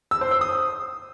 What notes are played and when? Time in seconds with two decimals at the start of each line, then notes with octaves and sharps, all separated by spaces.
0.11 E6
0.21 C5
0.31 E6
0.41 D#6